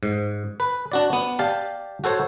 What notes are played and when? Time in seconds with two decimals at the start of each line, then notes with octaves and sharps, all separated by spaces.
0.03 G#2
0.60 B4
0.92 D4 F#4 D5
1.13 B3
1.39 G4 D5 F5 A5
2.04 F#4 A4 C5 C#5